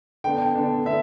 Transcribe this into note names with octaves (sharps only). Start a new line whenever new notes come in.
D3 B3 D4 G5
D3 B3 D4
D3 B3 E5